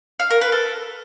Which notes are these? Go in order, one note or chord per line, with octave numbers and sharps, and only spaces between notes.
F5
A#4
B4
A4